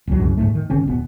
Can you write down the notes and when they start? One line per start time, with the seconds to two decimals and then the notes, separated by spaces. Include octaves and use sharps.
0.07 D#1 C2 F#3
0.19 C2 F#2 C#3
0.37 D#1 C2 G#2 A3
0.55 D#3
0.70 G1 C#3 C4 C#4
0.87 D#1 B2 B3